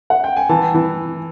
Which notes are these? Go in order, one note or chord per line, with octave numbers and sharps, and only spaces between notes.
F#5
G5
G#5
E3 A5
E3